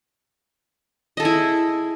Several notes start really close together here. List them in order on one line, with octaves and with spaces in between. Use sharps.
D#5 A4 G#4 E4